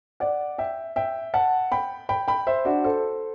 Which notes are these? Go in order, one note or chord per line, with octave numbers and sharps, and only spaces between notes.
D5 F#5
E5 G5
E5 G5
F#5 A5
G5 B5
G5 B5
G5 B5
C5 E5
D4 F#4
A4 C5